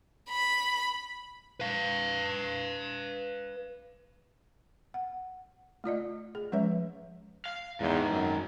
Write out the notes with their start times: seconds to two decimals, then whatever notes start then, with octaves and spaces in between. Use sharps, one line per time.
0.30 B5
1.60 B4 F5
4.94 F#5
5.84 A3 F4 D5 D#5
6.35 G#4
6.52 F3 G#3 C#4 B4 C#5 E5
7.46 F5
7.80 E2 G#2 D#3
8.11 F#2